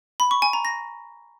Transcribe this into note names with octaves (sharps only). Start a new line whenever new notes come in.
B5
C#6
G#5
A#5
A#6